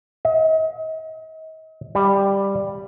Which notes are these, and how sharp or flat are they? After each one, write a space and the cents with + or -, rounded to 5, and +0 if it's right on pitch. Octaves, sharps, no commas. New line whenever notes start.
D#5 +40
G3 +10